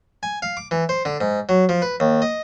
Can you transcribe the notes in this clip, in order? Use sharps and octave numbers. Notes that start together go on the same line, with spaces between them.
G#5
F5
D6
E3
C5
D3
G#2
F#3
F3
B4
D#2
D#5